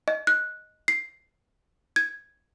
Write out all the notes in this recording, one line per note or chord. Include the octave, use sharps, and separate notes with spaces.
D#5
F#6
C7
G#6